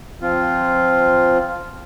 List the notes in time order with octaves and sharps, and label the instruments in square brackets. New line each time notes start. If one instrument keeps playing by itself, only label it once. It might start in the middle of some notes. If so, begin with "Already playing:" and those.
[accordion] F3 C4 F4